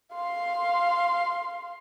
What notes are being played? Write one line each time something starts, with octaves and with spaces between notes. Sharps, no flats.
F5 C6